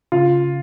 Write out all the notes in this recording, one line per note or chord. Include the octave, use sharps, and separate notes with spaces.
C#3 F4